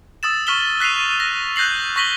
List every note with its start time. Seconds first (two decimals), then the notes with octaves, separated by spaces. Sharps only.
0.23 D#6 E6 A6 E7
0.47 C#6 E6 F6 B6 E7 G7
0.80 F#6 B6 C7 D#7 F7
1.20 A#6
1.56 F#6 G6 A#6 C7 F#7
1.96 C#6 A#6 B6 F#7 G7